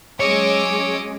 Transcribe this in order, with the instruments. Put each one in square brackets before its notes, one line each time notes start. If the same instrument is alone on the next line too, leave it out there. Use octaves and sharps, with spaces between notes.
[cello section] F#3 G#3 C#4 [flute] G#4 [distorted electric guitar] C#5 [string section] D#5 D6 E6